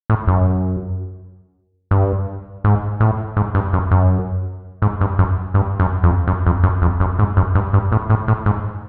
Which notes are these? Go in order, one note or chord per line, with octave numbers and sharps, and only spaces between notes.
A2
F#2
G2
G#2
A2
G#2
G2
F#2
F#2
G#2
G2
F#2
G2
F#2
F2
F#2
F2
F#2
F2
F#2
G#2
F#2
G2
G2
A2
A2
A2
G#2